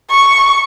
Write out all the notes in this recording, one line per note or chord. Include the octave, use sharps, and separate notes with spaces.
C#6